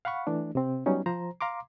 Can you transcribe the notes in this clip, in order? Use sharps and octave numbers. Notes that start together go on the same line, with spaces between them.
F5 F#5 B5 C#6
E3 A3 D4
C3 C4
F#3 G3 B3 C#4 D#4
F3 C5 A#5
F5 A#5 C6 D6